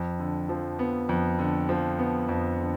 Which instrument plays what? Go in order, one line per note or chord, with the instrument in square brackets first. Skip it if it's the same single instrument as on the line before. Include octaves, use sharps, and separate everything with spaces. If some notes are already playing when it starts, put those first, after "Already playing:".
Already playing: [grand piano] F2
D3
F3
B3
F2
D3
F3
B3
F2
D3